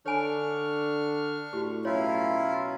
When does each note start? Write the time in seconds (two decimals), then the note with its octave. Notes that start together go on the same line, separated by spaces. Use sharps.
0.06 D3 D4 C#5 G#5 B5 C#6 F6
1.53 A2 F#4 G4
1.85 B2 F#3 C#4 E4 F4 C#5